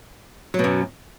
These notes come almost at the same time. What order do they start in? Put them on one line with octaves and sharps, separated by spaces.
F#3 B2 F#2